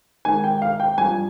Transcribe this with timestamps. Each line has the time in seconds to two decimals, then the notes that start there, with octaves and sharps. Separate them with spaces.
0.25 G#2 D#3 G#5
0.44 G5
0.62 F5
0.80 G5
0.98 G2 F3 G#5